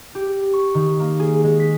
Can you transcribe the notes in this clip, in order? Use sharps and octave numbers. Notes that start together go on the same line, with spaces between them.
G4
C#6
D#3
A#3
G#4
G#3
B6